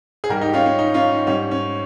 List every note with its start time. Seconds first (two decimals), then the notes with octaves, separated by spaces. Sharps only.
0.24 G#4
0.29 G#2 G3 G4 A#4
0.41 D#4 G4
0.53 C#4 F4
0.66 C#4
0.79 D#4
0.94 C#4 F4
1.12 D#4
1.27 G#2 G3 C#4
1.51 C#4